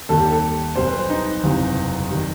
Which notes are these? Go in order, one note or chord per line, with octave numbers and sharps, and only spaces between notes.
D#2 D#3 G3 A4
G4
A4
B1 B2 G3 C5
B4
C5
D#4
F#1 E2 C3 E3 G3
D#3 G3